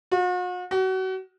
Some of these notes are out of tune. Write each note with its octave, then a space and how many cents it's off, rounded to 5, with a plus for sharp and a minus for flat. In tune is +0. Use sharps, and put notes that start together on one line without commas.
F#4 -45
F#4 +30